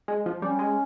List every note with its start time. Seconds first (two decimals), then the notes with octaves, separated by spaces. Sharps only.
0.08 G#3
0.26 F3
0.42 G3 C#4
0.59 G#3